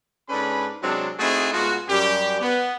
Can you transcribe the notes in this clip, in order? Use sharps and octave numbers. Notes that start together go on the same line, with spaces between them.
G#2 C#4 D4 A4 B4 B5
C3 F#3 G#3 C4 D4
A3 C4 D#4 E4 F#4 G#4
B2 G#3 B3 F4 F#4
F#2 G3 G4
B3